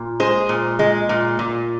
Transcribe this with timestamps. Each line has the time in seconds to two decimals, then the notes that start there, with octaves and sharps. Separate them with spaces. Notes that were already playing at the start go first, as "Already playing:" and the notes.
Already playing: A#2
0.20 G#3 G#4 C5
0.49 A#2
0.79 G#3
1.09 A#2
1.39 A#2